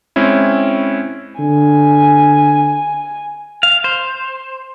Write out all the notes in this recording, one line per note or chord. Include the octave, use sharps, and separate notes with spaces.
G#3 C4 C#4 E4
D3 G#5
F5
C5